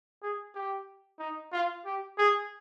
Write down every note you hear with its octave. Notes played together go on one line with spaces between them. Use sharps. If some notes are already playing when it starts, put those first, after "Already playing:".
G#4
G4
D#4
F4
G4
G#4